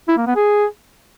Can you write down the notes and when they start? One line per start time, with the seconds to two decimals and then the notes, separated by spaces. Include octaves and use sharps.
0.08 E4
0.17 A#3
0.27 B3
0.36 G#4